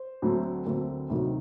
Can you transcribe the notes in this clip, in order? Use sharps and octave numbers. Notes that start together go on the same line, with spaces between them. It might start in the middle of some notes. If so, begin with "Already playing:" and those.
Already playing: C5
D2 D3 F#3 A3 C4
D2 D3 F#3 A3 C4 A#4
D2 C3 D#3 F#3